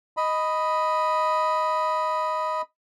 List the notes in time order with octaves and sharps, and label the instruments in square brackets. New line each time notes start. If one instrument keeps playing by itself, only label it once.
[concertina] D#5 B5